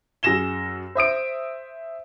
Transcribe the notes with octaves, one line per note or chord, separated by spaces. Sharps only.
F#2 G#4 A#6 E7 G7
C5 E5 D#6 D7